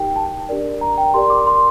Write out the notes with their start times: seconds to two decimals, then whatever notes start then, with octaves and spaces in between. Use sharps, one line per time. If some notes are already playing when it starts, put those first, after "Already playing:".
Already playing: D#4 G4 A#4 G5
0.16 A5
0.49 D4 G4 A#4 D5
0.81 A#5
0.98 G5
1.14 G4 A#4 D5 C6
1.30 D6
1.47 C6